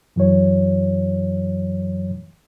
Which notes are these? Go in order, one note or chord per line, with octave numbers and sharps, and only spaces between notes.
F#2 E3 F#3 C#5